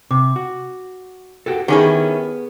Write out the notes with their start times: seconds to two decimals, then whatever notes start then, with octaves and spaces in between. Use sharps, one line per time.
0.11 C3 D6
0.36 F#4
1.46 F#4 G4 A4
1.68 D#3 B3 C#4 E4 G4 G#4 G#5